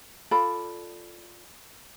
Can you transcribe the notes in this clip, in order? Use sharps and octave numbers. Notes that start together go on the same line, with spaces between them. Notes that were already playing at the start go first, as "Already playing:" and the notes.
F4 A4 D5 B5